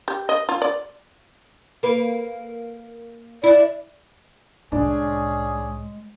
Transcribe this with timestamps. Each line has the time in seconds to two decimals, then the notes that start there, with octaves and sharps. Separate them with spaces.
0.08 G4
0.29 D#5
0.49 F4
0.62 D5
1.83 A#3 B4
3.43 E4 D5
4.72 C2 A2 G#3 C#4 D4 G#4 D5